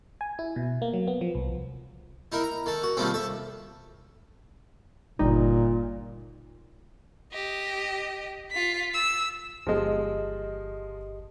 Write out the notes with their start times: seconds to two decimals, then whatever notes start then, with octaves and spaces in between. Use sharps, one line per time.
0.21 G#5
0.39 E4
0.56 B2
0.82 A#3
0.93 F#3
1.07 B3
1.21 F3
1.35 C2
2.32 D#4 E4 A#4
2.43 A#5
2.66 D#3 A4
2.83 F#4
2.97 C3 D#3 F3 G3 A3 C4
3.14 A4 E5
5.19 G1 A#2 G3 D#4
7.33 G4 D#5
8.51 F4 B6
8.94 E6
9.67 G1 F3 G#3 G4 D#5